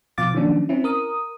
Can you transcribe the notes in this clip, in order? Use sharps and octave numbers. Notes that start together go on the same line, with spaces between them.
B2 F3 F5 D6 A6
D#3 F3 F#3 A#3 C#4 D4
C4 C#4 E4
A#4 D#6